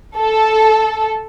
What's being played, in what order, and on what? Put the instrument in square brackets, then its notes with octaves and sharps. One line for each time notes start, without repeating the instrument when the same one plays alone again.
[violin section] A4